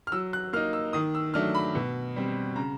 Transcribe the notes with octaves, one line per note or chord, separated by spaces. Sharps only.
F6
F#3 E6
F#6
A#3 D#4 F6
E6
D#3 D#6
E6
F#3 A3 D4 F6
B5
B2
G3 C4
C#3 A#5